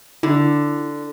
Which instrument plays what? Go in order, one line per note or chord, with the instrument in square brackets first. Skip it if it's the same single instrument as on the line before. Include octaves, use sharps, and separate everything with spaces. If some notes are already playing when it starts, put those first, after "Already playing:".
[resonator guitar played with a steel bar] D3 [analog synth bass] E4